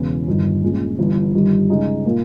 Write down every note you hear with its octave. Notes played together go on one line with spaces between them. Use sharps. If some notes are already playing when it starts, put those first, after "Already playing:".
Already playing: E1 E2 C#3 E3
G1 G2 D#3
A#2 G#3 C#4
G1 G2 E3
G1 G2 D#3 G3
C#3 G#3 D#4
A#2 A#3